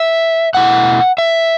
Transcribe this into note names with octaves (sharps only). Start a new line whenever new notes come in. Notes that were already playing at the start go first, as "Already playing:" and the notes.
Already playing: E5
B2 A3 E4 F#5
E5